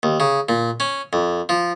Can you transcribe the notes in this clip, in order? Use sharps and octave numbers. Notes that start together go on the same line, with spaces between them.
D#2
C#3
A#2
C#4
F2
F3